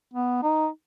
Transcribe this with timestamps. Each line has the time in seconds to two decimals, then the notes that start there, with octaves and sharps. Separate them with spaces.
0.14 B3
0.43 D#4